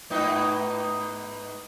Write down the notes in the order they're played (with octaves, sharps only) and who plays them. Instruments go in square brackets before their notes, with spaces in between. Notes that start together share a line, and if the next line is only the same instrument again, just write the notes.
[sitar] G#2 B3 D#4